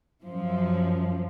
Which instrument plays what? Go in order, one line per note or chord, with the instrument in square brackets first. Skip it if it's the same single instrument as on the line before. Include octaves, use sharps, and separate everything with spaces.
[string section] F#2 F3